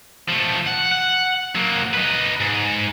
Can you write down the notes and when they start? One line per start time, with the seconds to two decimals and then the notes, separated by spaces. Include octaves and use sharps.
0.28 F3 A3
0.66 F#5
0.91 F#5
1.55 F#3 A#3
1.94 D#4 B4
2.41 G#2